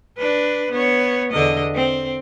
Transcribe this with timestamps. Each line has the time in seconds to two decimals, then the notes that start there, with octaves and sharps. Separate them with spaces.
0.17 D4 B4
0.72 B3 C#5
1.32 E2 D3 D#5
1.75 C4